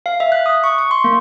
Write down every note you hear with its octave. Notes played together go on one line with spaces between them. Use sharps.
F5
E5
F#6
D#6
C#6
C#6
C6
A#3